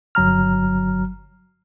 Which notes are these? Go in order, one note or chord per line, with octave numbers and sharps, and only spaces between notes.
G1 F#3 A#5 F6